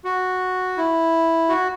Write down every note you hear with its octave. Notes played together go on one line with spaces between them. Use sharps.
F#4
E4
F#4